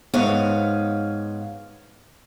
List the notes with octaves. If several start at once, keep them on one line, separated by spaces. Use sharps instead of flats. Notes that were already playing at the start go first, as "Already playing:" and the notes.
G#2 B3 C#5 F5